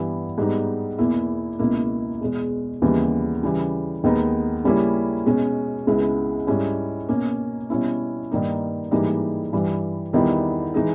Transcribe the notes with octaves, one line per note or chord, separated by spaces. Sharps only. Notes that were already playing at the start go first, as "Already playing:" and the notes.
Already playing: G2 E3 G3 B3 E4
G#2 G3 B3 D#4
E2 B2 A#3 E4
C#2 B2 A#3 E4
E2 B2 G#3
D#2 C#3 E3 G3 B3
C#3 E3 G3
D#2 D#3 G#3 B3 D#4
C#3 G3 A#3 C#4 E4
B2 G#3 C#4
C#2 C#3 G#3 B3 E4
G#2 G3 C#4 E4
B2 A#3 C#4
B2 G3 C#4 E4
G2 D#3 A#3 D#4
G#2 E3 G3 A#3 D#4
G2 E3 G3
E2 D#3 G3 B3 E4
E3 G#3 D#4